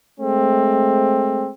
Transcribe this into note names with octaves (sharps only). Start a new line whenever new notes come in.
G#3 A3 C4